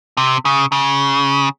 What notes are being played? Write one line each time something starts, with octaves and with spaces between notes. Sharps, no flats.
C3
C#3
C#3